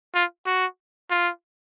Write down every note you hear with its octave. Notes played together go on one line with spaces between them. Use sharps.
F4
F#4
F4